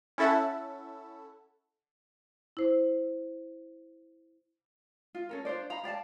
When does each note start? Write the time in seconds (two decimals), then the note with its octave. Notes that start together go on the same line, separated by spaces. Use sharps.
0.18 C#4 E4 A4 E5 F#5
2.57 E4 C5
5.15 F4
5.29 C#4 A4 A#4
5.45 D4 F4 C5 D5
5.70 F5 A#5 B5
5.84 G4 D5 F5 A5